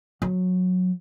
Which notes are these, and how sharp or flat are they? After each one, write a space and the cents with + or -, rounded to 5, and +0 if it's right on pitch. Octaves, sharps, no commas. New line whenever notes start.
F#3 -20